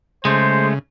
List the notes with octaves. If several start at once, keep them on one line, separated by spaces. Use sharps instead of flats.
C#3 G#3 A3 C5